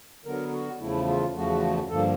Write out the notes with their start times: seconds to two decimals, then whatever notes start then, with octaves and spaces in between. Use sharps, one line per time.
0.25 D3 F#3 B3 A#4
0.53 F#4
0.80 E2 C#3 F3 A3 E4
1.07 F4
1.35 E2 C#3 F3 A3 F#4
1.90 G2 D3 F3 A#3 A4